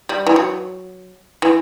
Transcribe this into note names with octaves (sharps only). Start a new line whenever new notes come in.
G3
E3
F#3
E3